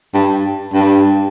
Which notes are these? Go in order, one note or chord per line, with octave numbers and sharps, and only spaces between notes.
G2
G2